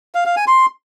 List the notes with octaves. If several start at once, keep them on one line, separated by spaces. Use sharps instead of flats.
F5
F5
G#5
C6